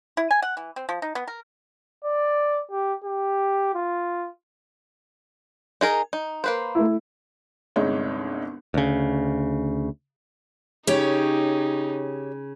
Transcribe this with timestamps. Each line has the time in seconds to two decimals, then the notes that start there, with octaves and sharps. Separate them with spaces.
0.17 E4
0.31 G#5
0.42 F#5
0.57 E3
0.76 C4
0.89 F3
1.02 D#4
1.15 B3
1.28 A#4
2.05 D5
2.71 G4
3.04 G4
3.74 F4
5.81 D#4 G#4 A#4
6.13 D#4
6.44 A#3 B4 C5
6.75 A3 E4
7.76 G1 C2 G#3 D#4 C#5
8.74 D2 C#3
10.87 C#3 D#4 G4 C#5 G5